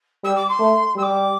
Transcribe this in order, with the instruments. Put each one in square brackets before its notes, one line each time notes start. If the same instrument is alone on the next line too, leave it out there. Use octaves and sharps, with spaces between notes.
[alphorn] G3 [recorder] E6
[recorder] D6
C6
[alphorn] A3
[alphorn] G3 [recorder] E6
[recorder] D6